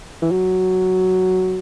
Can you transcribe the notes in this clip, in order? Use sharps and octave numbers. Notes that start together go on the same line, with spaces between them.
E3
F#3